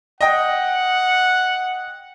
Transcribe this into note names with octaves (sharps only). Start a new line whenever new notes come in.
D#5 F#5 G5